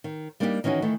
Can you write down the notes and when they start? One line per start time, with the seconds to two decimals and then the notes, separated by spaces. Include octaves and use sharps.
0.04 D#3
0.40 G3 A#3 D4 D#4 F#4 G4
0.64 D#3 E3 C#4 D#4 F#4
0.82 D#3 E3 A3